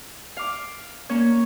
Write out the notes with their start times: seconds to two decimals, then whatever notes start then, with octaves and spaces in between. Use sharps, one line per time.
0.37 F5 D6
1.09 A#3 C#4 C#5